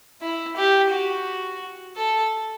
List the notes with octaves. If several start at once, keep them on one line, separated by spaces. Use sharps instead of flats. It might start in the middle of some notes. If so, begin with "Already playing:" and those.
E4
G4
F#4
A4